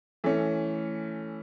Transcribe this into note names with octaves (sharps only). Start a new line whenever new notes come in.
E3 A3 C#4